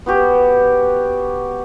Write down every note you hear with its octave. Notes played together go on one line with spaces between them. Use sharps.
B3 F#4 G4